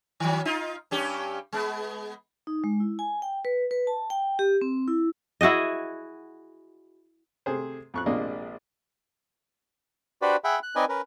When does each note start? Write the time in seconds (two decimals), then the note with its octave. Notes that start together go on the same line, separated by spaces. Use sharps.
0.20 D#3 F#3
0.45 D#4 F4
0.91 G2 C#4 G4
1.53 G#3 B3
2.47 D#4
2.64 G#3
2.80 E4
2.99 G#5
3.22 G5
3.45 B4
3.71 B4
3.87 A5
4.10 G5
4.39 G4
4.61 C4
4.88 E4
5.41 E4 F#4 G#4 D#5
7.46 C3 A3 G#4 C5
7.94 F2 C#6 F#6
8.06 A#1 C3 G#3 A#3 D4 D#5
10.22 D4 F#4 G4 B4 C5 D5
10.44 G#4 E5 F#5 G5 B5
10.63 F#6
10.76 C4 D#4 B4 D5 D#5 G#5
10.89 C#4 A#4 B4